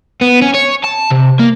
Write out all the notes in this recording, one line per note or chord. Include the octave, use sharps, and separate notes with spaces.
B3
C#4
C#5
A5
C3
A#3